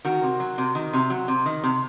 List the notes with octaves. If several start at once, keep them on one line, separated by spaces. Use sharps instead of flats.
D#3 F#4 A#4
C3
F#3
C3
D#3
C3
F#3
C3
D#3
C3